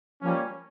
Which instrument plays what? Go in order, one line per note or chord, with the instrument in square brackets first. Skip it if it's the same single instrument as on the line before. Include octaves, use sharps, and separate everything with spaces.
[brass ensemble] F3 [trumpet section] G3 A#3 C#4